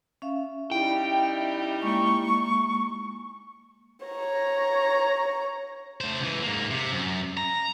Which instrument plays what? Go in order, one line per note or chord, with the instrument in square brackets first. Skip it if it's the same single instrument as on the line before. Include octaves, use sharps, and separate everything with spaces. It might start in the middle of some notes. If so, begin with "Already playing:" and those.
[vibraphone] C#4 E5 F5
[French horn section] G3 D#4 E4 [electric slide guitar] G5
[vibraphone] G#3 A#3 [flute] C#6
[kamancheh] C#5 A#5
[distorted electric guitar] A3 C5
C#2 E3
G#2 A#3
C3
F#2
A#5